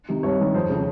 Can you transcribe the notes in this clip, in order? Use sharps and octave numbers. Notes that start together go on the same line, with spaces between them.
C3 D#3
C2 C#5
C3 D#3
F2 C5
C#3 F3